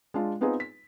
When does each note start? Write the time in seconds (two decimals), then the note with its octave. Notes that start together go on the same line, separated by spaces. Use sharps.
0.14 G#3 D4 F4
0.41 B3 C4 D#4 F4 G#4 B4
0.60 B6